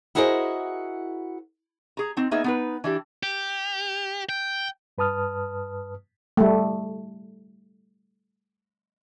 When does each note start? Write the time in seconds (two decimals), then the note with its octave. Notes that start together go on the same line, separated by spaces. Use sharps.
0.15 E4 F#4 G#4 A#4 C5 D#5
1.97 G#4 A#5
2.17 C4 D#4
2.31 A#3 B3 D#4 G#4 E5
2.44 B3 D#4 B4
2.84 E3 D4 G4
3.23 G4
4.29 G5
4.98 G2 B4 A5 D#6 F6
6.37 G3 A3